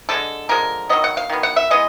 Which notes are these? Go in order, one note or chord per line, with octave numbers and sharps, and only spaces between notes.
D3 F3 G#3 A4
D3 F3 G#3 A#4
D#3 F#3 B3 D#5
F#5
F5
D#3 F#3 B3
F#5
E5
E3 G#3 B3 D#5